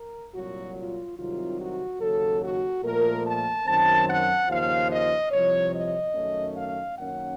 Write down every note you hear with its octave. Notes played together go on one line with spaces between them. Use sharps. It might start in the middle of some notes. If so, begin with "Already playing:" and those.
Already playing: A#4
C2 A#2 F#3 F#4
F4
C2 C3 D#3 F#3 F4
F#4
D#2 C#3 F#3 A4
F#4
A#2 F3 A3 A#4
A5
F#2 D#3 F#3 C4 A5
F#5
D#2 C#3 F3 F5
D#5
C2 C3 F3 C#5
D#5
F#2 D#3 A3 C#4
F5
F#2 D#3 A#3 C#4 F#5